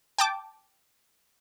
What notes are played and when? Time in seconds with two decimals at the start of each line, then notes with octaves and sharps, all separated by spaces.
0.18 G5 A5 D6